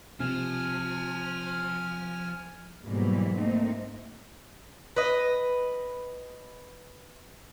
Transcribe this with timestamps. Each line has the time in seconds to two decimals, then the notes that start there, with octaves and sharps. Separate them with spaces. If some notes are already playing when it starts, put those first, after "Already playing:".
0.20 C3 F3 G#5 F6
2.86 G#2 B2 E3 F#3 G3 A#3
3.38 A3 A#3 C4 D#4
4.96 B4 D#5